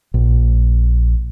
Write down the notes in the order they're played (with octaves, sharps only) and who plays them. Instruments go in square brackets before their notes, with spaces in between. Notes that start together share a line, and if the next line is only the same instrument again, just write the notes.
[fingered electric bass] A#1